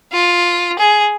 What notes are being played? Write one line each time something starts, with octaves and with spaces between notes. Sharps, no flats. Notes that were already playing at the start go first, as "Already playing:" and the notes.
F4
G#4